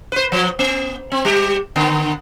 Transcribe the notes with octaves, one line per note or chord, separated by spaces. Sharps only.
B4 C5
F3
B3
C4
G3 G4
D3 B3